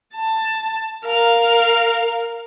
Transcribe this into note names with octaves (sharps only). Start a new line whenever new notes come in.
A5
A#4 F5